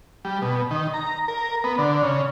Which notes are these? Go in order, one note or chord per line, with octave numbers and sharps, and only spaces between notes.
G3
B2
D#3
A#5
A#4
B3
D3
C#3